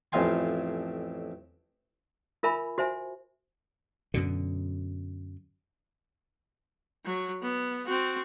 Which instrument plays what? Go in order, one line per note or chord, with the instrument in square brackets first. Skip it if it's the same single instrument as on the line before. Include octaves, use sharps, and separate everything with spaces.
[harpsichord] A1 F2 A2 F5 G#5 C6
[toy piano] F4 A#4 E5 G#5 B5
F#4 C5 E5 G#5
[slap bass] F#2 B2 D3
[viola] F#3
B3
C4 F#4